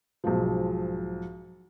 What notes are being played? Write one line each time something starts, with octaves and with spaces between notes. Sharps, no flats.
B1 G#2 F3